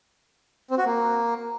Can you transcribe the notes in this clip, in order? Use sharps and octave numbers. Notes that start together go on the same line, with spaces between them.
C4
F#4
A#3